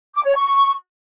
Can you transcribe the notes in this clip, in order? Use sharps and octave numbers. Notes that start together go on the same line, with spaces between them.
D6
C#5
C#6